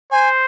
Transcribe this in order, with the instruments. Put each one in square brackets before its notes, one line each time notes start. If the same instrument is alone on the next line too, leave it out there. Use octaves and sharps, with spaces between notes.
[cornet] C5 [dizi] G#5